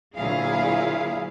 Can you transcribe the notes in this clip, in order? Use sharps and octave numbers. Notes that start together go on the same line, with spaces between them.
D2 A#2 F#3 E4 G#4 F5